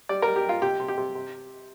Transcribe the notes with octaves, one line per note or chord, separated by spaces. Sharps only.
G3 D5
G3 A#4
G4
G3 F4
C3 G4
C3
G4
C3
C3